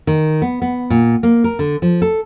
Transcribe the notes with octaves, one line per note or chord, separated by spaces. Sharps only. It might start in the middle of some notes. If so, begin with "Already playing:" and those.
D#3
B3
B3
A#2
A#3
A#4
D3
F3
A4